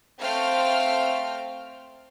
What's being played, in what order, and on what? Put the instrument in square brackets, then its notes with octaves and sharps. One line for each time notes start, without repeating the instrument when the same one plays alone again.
[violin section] A3 C4 C5 F5 G5 F6